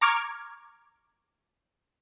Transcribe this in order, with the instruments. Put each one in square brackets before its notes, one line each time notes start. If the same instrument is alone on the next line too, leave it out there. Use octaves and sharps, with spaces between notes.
[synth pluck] A#5 C#6 D6 F6 G#6